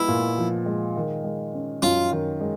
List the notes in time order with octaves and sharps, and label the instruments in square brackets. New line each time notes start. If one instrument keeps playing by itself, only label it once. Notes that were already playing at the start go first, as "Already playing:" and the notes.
Already playing: [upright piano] F3 G#3 B3 [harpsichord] E4
[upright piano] A#2
F3
G#3
D#3
G#3
C#4
[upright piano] F#2 [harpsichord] F4
[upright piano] D#3
G#3